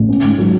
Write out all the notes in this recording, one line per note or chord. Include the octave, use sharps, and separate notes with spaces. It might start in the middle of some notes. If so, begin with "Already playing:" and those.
Already playing: A1
C#4
G#2
F#3